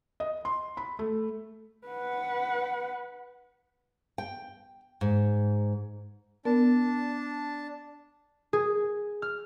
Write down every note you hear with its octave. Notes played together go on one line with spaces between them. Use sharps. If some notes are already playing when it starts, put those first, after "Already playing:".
D#5
C6
B5
A3
B4 F#5
G5
G#2
B3 D4 A#4 A5
G#4
F6